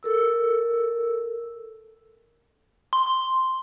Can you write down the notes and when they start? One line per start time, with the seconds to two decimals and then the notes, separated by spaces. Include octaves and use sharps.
0.03 A4 A#4 E6
2.93 C6